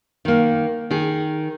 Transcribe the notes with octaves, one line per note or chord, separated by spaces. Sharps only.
D#3 A#3
D#3 G#4